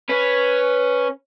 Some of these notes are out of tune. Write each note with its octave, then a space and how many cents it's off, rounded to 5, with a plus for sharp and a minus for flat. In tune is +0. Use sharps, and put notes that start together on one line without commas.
C#4 +0 B4 +0